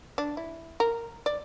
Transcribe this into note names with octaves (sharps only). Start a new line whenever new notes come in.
D4
E4
A#4
D5